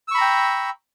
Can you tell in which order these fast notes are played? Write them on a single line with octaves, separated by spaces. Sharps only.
E6 C#6 B5 A#5 G5